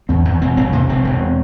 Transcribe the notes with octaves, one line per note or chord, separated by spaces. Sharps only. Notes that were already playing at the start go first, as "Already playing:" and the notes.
E2 C4
E2
E1 C4
E1 C4
C3 A#3
E1 C4
E1